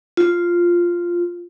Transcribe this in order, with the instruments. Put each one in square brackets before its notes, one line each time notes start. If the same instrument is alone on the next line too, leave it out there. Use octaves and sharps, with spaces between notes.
[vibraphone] F4